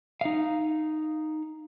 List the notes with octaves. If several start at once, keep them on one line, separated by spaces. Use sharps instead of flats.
D#4 F5